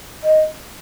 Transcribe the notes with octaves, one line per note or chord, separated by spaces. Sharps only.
D#5